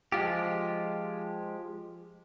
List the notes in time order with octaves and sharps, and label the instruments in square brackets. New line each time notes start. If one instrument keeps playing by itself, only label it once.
[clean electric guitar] F3 G#3 F4 G4